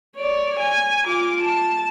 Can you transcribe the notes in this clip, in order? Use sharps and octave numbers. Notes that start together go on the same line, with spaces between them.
C#5 D5
G#5
F4 D6
A5